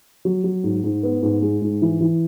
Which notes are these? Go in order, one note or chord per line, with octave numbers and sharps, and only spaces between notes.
F#3
F#3
G#2
G#2
B3
G#2
G#3
G#2
E3
E3